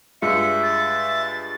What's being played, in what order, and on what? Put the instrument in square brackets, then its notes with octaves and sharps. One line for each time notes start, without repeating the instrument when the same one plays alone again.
[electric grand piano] G2 G#3 F4 [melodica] E5 [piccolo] C#7
[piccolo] A6